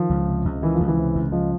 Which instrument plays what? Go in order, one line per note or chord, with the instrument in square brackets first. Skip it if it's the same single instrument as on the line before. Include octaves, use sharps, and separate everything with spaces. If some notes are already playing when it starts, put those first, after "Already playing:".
Already playing: [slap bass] D#3 [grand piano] F3
[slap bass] C#2
C3
C#2
[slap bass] D#3 [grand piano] E3
[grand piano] F3
[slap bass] C#2
[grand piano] E3
[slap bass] C3
C#2
[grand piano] F3 [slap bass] G#3